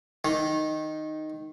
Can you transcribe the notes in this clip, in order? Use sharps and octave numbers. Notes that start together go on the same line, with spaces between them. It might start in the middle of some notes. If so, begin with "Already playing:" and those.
D#3